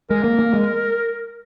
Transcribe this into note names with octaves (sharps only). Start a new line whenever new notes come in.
G#3 A#4
A#3
A#3
G#3